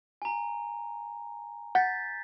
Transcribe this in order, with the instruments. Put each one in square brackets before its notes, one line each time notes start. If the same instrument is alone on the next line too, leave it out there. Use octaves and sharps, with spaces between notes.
[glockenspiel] G#5 A#5
[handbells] F#5 [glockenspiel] G6 A6 B6